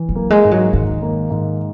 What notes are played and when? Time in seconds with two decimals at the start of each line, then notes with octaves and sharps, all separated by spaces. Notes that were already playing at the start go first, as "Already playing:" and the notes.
Already playing: E3
0.09 F#3
0.15 A#3
0.30 G#3
0.44 G#2
0.51 F#3
0.73 G#2 D#3
1.02 A#3
1.31 G#2